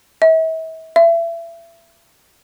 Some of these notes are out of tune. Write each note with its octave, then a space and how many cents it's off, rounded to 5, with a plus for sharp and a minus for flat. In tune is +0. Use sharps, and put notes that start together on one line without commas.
E5 -40
E5 +30